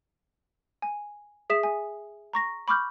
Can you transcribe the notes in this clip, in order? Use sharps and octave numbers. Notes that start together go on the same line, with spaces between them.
G#5
G#4 E5 D#6 B6 E7
G#5
A#5 C#6 A#6
B5 C#6 D6 F6 G6